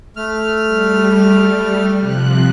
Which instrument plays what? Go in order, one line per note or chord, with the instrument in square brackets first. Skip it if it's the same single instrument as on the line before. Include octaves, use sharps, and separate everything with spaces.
[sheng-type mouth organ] A3 F6
[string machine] G3
C3 F3 F#6